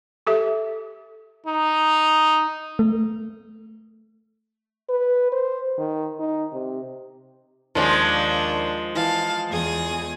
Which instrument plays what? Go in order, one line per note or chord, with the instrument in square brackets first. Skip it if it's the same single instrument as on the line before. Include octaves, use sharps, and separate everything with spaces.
[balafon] G4 A4 E5
[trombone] D#4
[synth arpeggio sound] A3
[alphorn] B4
C5
D#3
D#4
C3
[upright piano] D#2 D5 [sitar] F3 G#3 [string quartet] D4
[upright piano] E3 [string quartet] F5 A5
[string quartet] E2 G#4 D#6